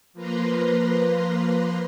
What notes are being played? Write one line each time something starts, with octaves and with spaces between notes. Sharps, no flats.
F3 A#3 B4 A#5 C6